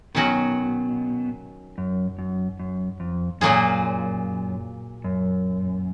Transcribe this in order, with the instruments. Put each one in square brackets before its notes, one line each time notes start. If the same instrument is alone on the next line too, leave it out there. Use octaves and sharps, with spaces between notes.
[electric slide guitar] B2 [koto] D#3 F#3 C#4 F#4
[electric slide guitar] F#2
F#2
F#2
F2
[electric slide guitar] F#2 [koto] A#2 F#3 A#3 F4 G#4
[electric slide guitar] F#2